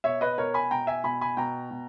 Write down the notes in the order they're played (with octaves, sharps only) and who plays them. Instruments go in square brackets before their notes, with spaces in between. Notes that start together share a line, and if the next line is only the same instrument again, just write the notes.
[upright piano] B2 C#5 E5
B4 D#5
B2 A#4 C#5
G#5 B5
B2 G5 A#5
E5 G#5
B2 G#5 B5
G#5 B5
B2 G5 A#5
B2